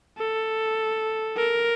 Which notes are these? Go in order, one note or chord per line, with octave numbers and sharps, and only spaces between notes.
A4
A#4